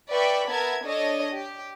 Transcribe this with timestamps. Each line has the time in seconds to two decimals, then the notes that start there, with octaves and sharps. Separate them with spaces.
0.11 B4 D5 E5 G5 B5 C#6
0.49 B3 A#4 E5 A5 G#6
0.86 D4 A4 C#5 D#5
1.34 G4